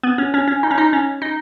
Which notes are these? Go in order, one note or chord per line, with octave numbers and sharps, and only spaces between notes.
B3
C#4
C#4
C#4
D#4
C#4
D#4
C#4
D#4